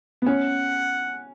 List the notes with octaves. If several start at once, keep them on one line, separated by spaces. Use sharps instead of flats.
B3
C#4 F#5